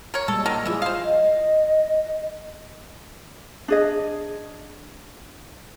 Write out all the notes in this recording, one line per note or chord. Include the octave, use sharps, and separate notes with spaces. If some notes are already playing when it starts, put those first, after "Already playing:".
A#4 C#5
A#2 G3 G#3 A4
D3 D#3 A#4
E3 F3 E4 F4 G#4
C5 F5
D#5
D4 G#4 D#5